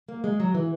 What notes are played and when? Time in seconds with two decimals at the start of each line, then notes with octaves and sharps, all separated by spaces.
0.09 A#3
0.24 G#3
0.40 F#3
0.54 E3